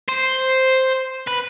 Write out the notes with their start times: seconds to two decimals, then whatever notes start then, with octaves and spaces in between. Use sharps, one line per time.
0.08 C5
1.27 B4